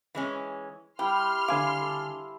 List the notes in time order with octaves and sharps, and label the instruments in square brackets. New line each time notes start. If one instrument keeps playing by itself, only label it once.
[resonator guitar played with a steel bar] E3 G#3 C#4
[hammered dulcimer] G3 E4 [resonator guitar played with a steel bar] G5 [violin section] C6 F6
[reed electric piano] D3 G#5 D6 [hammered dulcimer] C5 [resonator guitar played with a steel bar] F5
[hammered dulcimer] A4